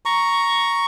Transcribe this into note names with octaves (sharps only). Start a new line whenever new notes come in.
A#5 C#6